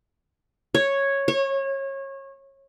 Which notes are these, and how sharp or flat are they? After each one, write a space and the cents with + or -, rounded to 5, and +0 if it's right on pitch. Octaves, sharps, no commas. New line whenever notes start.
C#5 -5
C#5 -25